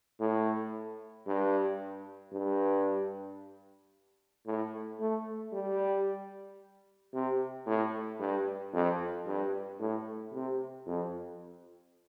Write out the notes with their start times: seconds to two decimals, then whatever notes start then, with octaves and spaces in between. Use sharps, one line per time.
0.20 A2
1.26 G2
2.33 G2
4.46 A2
5.00 A3
5.53 G3
7.13 C3
7.66 A2
8.19 G2
8.73 F2
9.26 G2
9.79 A2
10.33 C3
10.86 F2